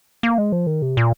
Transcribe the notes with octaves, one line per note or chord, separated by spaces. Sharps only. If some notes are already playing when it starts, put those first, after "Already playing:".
A#3
G#3
F3
D#3
C3
A#2